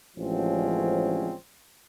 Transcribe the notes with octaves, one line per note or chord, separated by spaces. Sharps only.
A1 D3 F3 G#3 C4 C#4